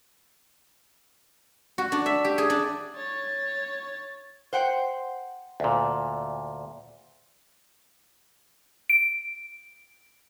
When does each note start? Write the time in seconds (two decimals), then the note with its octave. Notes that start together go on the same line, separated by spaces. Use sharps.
1.78 F#4
1.92 D4
2.06 E5
2.25 G4
2.38 G#4
2.50 D4
2.96 C#5 A6
4.53 C5 F#5 G5
5.60 D2 A#2
8.90 D7